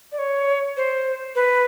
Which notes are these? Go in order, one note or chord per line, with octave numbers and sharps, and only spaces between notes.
D5
C#5
C5
B4